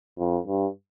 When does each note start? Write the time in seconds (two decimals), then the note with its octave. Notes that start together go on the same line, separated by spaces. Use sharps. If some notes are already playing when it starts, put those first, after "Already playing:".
0.19 F2
0.47 G2